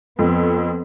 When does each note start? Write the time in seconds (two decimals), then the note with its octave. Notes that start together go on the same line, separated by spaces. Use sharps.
0.19 F2 B3 C4